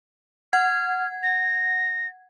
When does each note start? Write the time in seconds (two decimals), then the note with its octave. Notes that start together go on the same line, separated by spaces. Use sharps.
0.53 F#5 F6 G#6
1.23 A#6